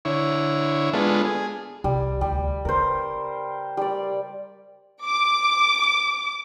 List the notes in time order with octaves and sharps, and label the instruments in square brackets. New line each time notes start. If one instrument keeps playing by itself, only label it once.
[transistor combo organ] D3 E4 C#5
G#3 B3 D4 F4 A4
G#4
[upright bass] C2 [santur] G3
[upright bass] D2 [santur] G3
[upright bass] C#3 [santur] A#4 C5
[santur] G3 D5
[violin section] D6